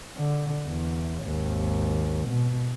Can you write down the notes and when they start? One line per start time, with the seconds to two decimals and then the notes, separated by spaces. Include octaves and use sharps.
0.17 D3
0.67 E2
1.22 G#1 D#2
2.28 B2